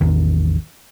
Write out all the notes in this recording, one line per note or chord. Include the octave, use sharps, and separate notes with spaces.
A1 E2 D#3